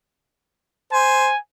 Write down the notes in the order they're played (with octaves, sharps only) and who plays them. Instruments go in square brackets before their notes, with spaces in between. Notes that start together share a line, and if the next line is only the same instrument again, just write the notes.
[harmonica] C5 [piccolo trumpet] G#5